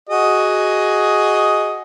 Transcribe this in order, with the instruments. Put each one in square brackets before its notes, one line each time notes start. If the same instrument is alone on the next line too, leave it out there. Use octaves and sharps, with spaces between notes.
[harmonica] F#4 G#4 D#5